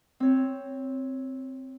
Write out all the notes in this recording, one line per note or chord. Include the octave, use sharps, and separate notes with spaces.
C4 C#5